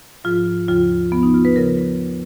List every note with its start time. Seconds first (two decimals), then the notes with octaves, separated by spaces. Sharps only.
0.24 G#2 F3 F4
0.68 D#2 C#3 F3 F4
1.12 D#2 C#3 F3 B3
1.23 D#4
1.34 F4
1.45 B4
1.56 C#3 F3 A#4